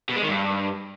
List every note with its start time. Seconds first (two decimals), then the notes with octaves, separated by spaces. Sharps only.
0.09 B2
0.16 G#3
0.22 D#3
0.29 G2